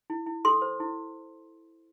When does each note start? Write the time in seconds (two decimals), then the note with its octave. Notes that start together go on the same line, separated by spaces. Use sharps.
0.10 E4
0.26 E4
0.45 A4 C6
0.62 C5
0.80 E4